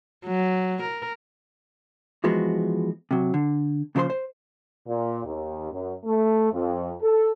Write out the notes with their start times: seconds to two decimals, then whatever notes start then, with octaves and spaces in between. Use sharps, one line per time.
0.26 F#3
0.81 A#4
2.24 E3 F3 G#3 B3 F#4
3.11 C3 F#3
3.34 D3
3.95 A#2 C#3 F3 A#4 C5 C6
4.10 C5
4.87 A#2
5.24 D#2
5.71 F#2
6.05 A3
6.52 F2
7.01 A4